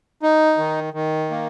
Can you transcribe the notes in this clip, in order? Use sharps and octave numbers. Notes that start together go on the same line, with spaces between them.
D#4
D#3
D#3
A#3